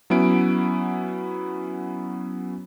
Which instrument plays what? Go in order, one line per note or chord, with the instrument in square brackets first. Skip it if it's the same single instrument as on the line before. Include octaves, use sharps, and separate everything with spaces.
[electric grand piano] F#3 B3 C#4 E4 D7